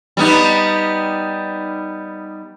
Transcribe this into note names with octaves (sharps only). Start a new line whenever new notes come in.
G3 B3 D#4